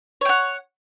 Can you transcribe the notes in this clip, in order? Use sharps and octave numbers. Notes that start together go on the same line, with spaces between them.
C#5 F#5 G5